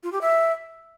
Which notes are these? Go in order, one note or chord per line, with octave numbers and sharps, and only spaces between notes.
F4
G4
E5